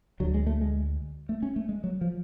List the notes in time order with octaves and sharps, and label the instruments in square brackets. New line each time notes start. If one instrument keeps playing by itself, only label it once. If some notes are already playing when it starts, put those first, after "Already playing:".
[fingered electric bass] D2 D3 F#3
G#3
A3
G#3
A3
C#4
A3
G#3
F#3
F3